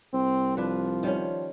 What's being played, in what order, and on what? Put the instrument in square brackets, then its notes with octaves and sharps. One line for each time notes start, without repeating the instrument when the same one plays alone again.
[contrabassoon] C2 [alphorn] C4
[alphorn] F3 [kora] D4 B4
[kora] D#3 G3 C#4